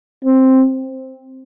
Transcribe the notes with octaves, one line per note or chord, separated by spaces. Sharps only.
C4